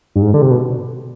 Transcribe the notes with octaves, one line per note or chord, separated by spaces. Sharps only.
G2
G#2
D3
C3
B2